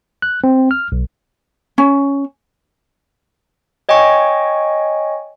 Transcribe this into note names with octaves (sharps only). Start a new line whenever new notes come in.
F#6
C4
F6
B1
C#4
C#5 D#5 G5 G#5 C#6